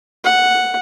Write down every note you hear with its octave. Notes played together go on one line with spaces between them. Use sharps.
F#5